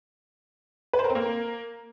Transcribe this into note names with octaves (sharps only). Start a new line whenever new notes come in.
B4
C5
A#4
C4
A#3